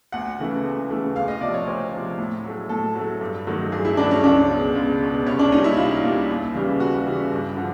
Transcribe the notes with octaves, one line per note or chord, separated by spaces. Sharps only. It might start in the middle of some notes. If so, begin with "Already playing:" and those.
D2 F#5
C#3 E3 A3
D2
C#3 E3 A3
D2 F5
D#5
C3 F3 D5
C#5
D2 C5
C3 F3
A2
F#3 A3
A2 A4
F#3 A3
G2
D#3 F#3 A3
G2 G#4
E4
D#3 F#3 A3 D4
C#4
C#2 D4
B2 G#3
C#2
B2 G#3
C2 C#4
D4
A#2 G3 D#4
E4
C2 F4
A#2 G3
D#2
C#3 E3 G3
D#2 F#4
C#3 E3 G3
G2
D3 F3